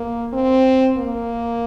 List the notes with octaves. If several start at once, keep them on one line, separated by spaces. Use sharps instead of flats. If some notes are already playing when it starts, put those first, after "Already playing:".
Already playing: A#3
C4
A#3